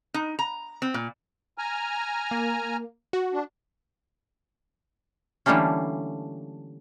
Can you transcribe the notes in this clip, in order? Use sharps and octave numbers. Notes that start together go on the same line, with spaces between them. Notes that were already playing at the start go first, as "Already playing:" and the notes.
D#4
A#5
C4
A#2
G#5 A#5 F6
A#3
F#4
D4
D3 E3 G3 A3 A#3 C#4